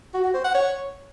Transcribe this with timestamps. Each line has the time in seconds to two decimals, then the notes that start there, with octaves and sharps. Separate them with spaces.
0.14 F#4
0.24 F#4
0.34 C5
0.44 F#5
0.54 C#5